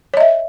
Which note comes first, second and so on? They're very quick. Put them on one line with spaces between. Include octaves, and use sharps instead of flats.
C#5 D#5 E5